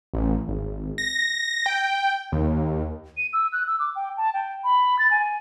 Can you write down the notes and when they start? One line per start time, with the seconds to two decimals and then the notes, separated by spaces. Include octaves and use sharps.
0.14 A1
0.48 G#1
0.98 A#6
1.66 G5
2.32 D#2
3.17 D#7
3.33 E6
3.53 F#6
3.67 E6
3.79 D6
3.96 G5
4.17 A5
4.34 G5
4.64 B5
4.99 A6
5.11 G#5